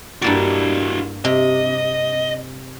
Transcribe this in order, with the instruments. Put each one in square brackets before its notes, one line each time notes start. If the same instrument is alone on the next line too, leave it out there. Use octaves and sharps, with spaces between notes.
[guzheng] G2 A#3 D5 [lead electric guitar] E4 F#4
[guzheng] C3 [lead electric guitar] D#5